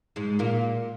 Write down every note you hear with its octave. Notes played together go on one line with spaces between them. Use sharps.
G#2 G#3
A#2 A#3